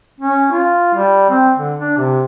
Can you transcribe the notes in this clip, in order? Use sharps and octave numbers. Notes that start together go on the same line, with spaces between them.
C#4
F4
G3
C4
D3
D4
C3